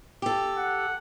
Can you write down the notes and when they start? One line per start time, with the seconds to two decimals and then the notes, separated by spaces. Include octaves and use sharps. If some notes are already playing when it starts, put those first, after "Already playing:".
0.22 G4 A4
0.58 F#5